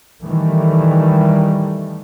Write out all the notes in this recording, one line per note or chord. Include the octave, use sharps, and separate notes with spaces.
D#3 E3 G3 A3